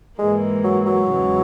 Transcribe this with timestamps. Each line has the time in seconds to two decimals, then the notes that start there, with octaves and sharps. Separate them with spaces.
0.19 G#2 E3 G#3 A#3
0.64 F#3
0.86 F#3
1.08 E2 C#3 E3 G#3